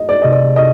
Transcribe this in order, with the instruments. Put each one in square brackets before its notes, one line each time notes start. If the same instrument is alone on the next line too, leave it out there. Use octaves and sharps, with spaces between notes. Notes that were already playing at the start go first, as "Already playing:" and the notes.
Already playing: [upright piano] D#5
D5
[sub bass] C3 [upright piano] D#5
[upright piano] D5
D#5